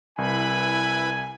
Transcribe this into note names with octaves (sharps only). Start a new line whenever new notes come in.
C2 E4 B4 G#5 B5